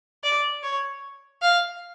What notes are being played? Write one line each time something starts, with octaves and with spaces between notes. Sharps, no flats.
D5
C#5
F5